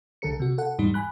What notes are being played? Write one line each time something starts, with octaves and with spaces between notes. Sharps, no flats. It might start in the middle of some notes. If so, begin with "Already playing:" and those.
C2 D3 A4 A#4 C#7
C3 F#4
A4 F#5
E2 G#2 G3 D#4
G#5 B5 F#6